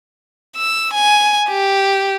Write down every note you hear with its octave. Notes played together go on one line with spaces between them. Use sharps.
E6
G#5
G4